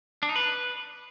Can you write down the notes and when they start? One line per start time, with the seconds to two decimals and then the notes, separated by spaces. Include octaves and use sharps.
0.23 D4
0.29 D#4
0.36 B4